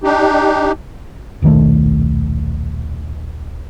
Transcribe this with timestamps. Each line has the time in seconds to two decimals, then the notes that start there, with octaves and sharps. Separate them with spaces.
0.03 D4 D#4 G4
1.42 D#1 B1 D#3 A3